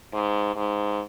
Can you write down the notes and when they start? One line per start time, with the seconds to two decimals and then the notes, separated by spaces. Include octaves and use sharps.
0.13 G#2
0.56 G#2